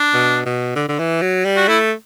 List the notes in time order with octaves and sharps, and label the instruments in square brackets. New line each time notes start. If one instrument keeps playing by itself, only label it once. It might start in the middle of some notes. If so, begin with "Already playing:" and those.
Already playing: [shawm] D4
[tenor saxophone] B2
B2
D3
D3
E3
F#3
G3
[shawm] F#4
[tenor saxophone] A3 [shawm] E4